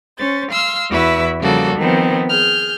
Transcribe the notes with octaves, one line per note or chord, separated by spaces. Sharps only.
C#4 C5 A6
F5 C6 E6 F6
E2 E4 F#4 B4 E5
C#3 F3 G3 A#3 F#4 A4
D#3 F3 B3 C4
G#4 F6 G6